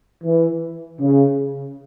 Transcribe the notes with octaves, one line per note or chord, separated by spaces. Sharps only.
E3
C#3